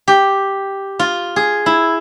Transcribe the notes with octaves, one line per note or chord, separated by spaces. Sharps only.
G4
F4
G#4
E4